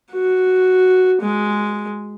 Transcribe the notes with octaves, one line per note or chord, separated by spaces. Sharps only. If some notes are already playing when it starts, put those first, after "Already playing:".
F#4
G#3